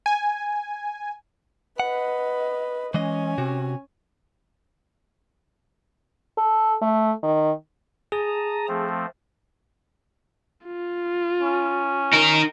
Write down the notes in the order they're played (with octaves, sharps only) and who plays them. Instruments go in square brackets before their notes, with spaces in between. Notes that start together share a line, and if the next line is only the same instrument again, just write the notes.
[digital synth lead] G#5
[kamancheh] B4 D#5 [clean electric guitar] F#5
[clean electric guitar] E3 G#3 D#5 [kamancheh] C#4 G#5
[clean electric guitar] C3 F#4
[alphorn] A4
A3
D#3
[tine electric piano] G#4 [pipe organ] A5 A#5 D#6
[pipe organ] F3 A3 C4
[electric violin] F4
[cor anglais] C#4
[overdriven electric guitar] D#4 A#4